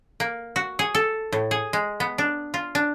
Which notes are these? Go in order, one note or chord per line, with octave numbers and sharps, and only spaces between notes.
A#3
F#4
G#4
A4
A2
G#4
G#3
B3
D4
F4
D4